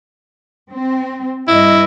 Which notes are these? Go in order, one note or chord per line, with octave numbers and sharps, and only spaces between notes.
C4
G2 E4 D#5